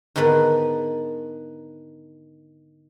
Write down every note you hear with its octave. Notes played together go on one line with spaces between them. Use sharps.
G#2 D3 D#3 B3 B4